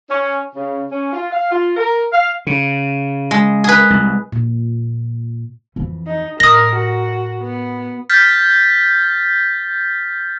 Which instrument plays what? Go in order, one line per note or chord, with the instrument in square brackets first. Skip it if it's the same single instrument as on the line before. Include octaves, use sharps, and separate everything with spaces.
[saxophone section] C#4
C#3
C#4
F4
F5
F4
A#4
F5
[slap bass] C#3
[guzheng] G#3
G#4 B4
[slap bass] C2
[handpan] A#2
[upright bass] F2 E3
[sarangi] D#4
[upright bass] A2 [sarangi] A#4 [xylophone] D#6 A#6
[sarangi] F#4
B3
[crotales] F6 G6 A6 B6